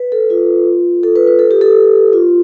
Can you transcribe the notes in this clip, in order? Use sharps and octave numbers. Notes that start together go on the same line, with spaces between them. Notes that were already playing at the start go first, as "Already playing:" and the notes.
Already playing: B4
A4
F4
A4
B4
B4
A4
G4
A4
F4